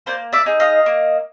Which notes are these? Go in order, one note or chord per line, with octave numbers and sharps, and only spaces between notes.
A#3 C5 D5
D5 E5
D#4 G#4
D#5 F5
A#3